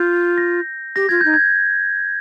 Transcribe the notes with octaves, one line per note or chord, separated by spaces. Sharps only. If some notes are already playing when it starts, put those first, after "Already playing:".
Already playing: F4 G6
A#6
G4 A#6
F4 G#6
D#4 G6
G#6